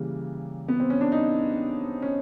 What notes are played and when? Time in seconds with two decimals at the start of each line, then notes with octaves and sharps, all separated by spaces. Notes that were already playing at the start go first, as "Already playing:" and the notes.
Already playing: C#3 E3 G3 A#3
0.68 B3
0.80 C4
0.90 C#4
1.01 D4
1.12 D#4
2.02 C#4